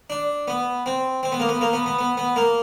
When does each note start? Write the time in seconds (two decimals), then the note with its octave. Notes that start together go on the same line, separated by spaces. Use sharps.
0.10 D4
0.48 B3
0.86 C4
1.23 C4
1.32 B3
1.40 A#3
1.49 B3
1.61 A#3
1.73 B3
1.86 B3
1.98 B3
2.17 B3
2.36 A#3